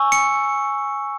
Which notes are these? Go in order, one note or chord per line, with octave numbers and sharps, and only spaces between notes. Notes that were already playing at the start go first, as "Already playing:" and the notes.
Already playing: G#5 C#6 E6
C#7